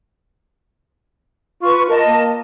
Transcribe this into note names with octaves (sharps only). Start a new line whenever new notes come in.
F4 B4 C#6
A#4 D#5 A5
A#3